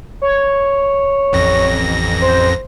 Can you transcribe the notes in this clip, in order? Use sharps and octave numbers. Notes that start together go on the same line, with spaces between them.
C#5
A1 F2 A#6
C5